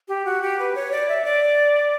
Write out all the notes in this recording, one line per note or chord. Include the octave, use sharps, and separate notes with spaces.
G4
F#4
G4
B4
C#5
D5
E5
D5